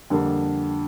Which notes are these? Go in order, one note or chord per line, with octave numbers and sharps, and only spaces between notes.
F2 D3 G3 A#3